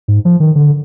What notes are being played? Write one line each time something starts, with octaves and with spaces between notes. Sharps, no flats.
G#2
F3
D#3
D3